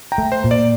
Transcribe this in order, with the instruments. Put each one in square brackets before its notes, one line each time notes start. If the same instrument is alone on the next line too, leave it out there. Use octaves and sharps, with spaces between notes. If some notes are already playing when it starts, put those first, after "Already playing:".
[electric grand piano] G5 A#5
[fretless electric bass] A3
[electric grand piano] C5
[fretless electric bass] A#2
[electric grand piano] D5